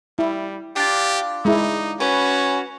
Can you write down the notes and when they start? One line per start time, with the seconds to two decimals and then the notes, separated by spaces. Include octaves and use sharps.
0.19 G3 E4
0.76 D4 F4 G4
1.45 G#3 D#4 E4
2.00 C#4 F#4 B4